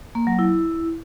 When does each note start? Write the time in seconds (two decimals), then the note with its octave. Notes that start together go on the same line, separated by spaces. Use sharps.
0.15 A#3
0.27 F#3
0.39 E4